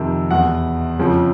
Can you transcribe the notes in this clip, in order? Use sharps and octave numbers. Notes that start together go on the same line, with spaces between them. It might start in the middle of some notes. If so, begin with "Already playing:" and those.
Already playing: F2 C3 D#3
E2 B2 F#5
F2 C#3 F3